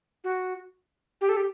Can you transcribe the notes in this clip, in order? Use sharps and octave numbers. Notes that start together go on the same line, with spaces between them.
F#4
G4
A4
G4